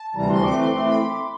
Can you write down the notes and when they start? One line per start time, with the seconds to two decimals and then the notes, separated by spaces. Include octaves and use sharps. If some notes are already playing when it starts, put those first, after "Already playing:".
Already playing: A5
0.15 D2 C3 E3 G3 A#5
0.30 C6
0.40 C#6
0.44 E3 A3 C4 D6
0.58 C6
0.72 E3 A3 C4 C6
0.86 B5